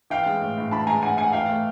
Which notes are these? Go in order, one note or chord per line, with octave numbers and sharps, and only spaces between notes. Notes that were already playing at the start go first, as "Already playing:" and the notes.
E3 F5 G5
G#3
A2
A2
E3 A5 B5
G#3 G#5 A#5
A2 F#5 G#5
A2 F#5 G#5
E3 F5 G5
A3